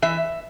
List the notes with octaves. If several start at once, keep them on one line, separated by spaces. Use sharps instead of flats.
E3 E5